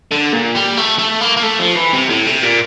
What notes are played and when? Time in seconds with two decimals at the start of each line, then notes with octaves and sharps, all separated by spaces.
0.11 D3
0.32 A#2
0.55 G3
0.77 A3
0.99 A3
1.21 A#3
1.37 A#3
1.43 A3
1.60 F3
1.77 E3
1.93 C3
2.09 A2
2.26 C3
2.43 A#2